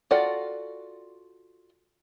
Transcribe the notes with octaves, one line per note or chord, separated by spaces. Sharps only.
F4 F#4 A4 D5 F#5